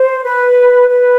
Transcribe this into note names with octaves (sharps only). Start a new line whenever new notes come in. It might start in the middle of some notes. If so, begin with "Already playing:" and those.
Already playing: C5
B4
B4